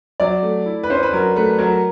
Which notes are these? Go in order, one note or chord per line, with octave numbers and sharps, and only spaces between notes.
F#3 D5
A3
E4
B4
C#4 C5
B4
F#3 A#4
A3 B4
F#3 A#4